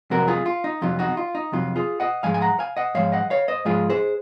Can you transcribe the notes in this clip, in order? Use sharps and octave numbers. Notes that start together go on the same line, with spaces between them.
F2 C3 F#3 F#4 A#4
F4 G#4
F4
D#4
F2 C3 F#3 F4
D#4 F#4
F4
D#4
F2 C3 F#3 F4
F4 G#4
D#5 F#5
G#2 F3 G#3 F5 G#5
G#5
F#5 A#5
F5 G#5
D#5 F#5
G#2 F3 G#3 C#5 F5
D#5 F#5
C#5 F5
C5 D#5
G#2 F3 G#3 F4 G#4
G#4 C5